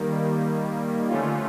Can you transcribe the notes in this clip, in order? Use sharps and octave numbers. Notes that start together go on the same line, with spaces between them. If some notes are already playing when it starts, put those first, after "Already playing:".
Already playing: D#3 G3 A#3
D3 F3 A3 C#4 F4